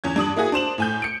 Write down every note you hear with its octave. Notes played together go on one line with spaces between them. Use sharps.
E2 C#4 G#6
G2 D4 D#6 F#7
A#3 E4 F#4 G#4
D4 C5 E7 F#7
A2 G#5 G6
C#7 D7